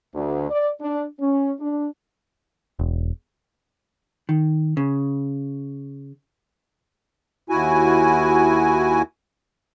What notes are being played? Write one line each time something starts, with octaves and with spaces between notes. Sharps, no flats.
D2
D5
D4
C#4
D4
E1
D#3
C#3
D#2 E4 F#4 G#5